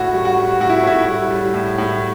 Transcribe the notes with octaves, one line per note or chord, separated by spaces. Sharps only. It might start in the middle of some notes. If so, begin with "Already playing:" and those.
Already playing: A2 F#4
G3
F#4
G3
A2 F#4
E4
A2 E4
G3
G3
A2
A2